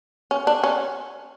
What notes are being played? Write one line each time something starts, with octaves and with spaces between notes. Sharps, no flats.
C#4
D4
C#4